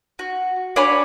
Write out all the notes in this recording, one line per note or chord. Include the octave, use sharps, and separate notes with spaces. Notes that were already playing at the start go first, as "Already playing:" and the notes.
F#4
D4 C#5 G#5 B5